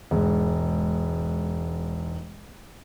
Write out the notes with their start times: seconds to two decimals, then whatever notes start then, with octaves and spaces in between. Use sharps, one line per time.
0.11 E1 G#2